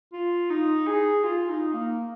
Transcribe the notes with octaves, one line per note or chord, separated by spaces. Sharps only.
F4
D#4
G#4
F4
D#4
A#3